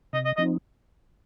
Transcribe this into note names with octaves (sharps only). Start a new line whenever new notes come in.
C3 D#5
D#5
F3 C4 D#4 D#5